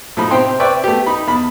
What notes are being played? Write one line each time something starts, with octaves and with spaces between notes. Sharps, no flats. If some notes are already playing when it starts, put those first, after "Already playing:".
A2 F3 D#4 B5
C3 C4 C5 G5 C6
B4 D5 E5 G5 C#6
A3 B3 G4
D#4 B5
E2 B5